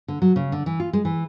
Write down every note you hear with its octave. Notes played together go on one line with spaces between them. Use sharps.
D3
F#3
C#3
D3
E3
F4
G#3
E3